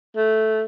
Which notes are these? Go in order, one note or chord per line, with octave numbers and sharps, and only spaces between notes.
A3